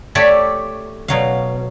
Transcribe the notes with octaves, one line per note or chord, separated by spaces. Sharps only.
A3 G4 C#5 D5 E5
B2 F#3 F5